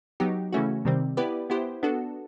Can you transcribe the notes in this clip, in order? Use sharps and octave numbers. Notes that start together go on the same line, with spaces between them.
F#3 B3 D#4 G4
C#3 E3 A3 C#4 F#4
C3 D#3 G3 C4
B3 E4 G4 B4 D5
B3 E4 G4 C5
B3 D4 F#4 A4